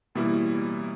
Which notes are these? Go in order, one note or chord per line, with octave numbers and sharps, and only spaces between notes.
A1 B2 G3 A#3 E4